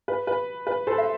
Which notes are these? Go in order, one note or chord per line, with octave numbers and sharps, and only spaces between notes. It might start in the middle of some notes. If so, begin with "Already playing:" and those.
B4
B4
B4
A4 C5
E5